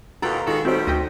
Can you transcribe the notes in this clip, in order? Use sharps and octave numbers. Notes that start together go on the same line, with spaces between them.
D#2 B2 F4 A4 F#5 G5 A#5
D#3 G#3 F4 F#4 A4
B2 G3 A3 C4 D#4 F#4 C5
D2 D#5 G5